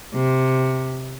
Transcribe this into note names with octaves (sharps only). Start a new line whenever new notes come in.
C3